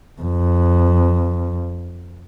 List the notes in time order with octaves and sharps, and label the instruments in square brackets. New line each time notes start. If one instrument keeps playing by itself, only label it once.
[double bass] F2